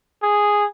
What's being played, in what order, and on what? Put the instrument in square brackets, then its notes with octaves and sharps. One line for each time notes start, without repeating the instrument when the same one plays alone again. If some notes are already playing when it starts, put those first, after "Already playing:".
[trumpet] G#4